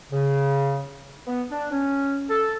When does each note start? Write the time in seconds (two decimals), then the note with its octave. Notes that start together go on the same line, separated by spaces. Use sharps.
0.12 C#3
1.27 B3
1.51 D4
1.72 C#4
2.29 A4